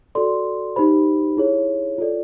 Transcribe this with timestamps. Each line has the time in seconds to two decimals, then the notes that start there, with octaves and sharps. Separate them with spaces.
0.15 F#4 A4 D5 C6
0.76 D#4 G4 C5 B5
1.37 E4 G#4 C#5
1.98 F4 A4 D5